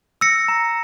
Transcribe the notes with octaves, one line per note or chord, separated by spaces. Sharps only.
E6 A#6 C#7
A#5